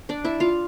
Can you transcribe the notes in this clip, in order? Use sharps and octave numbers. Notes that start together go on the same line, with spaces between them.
D4 D5
E4 E5
F4 F5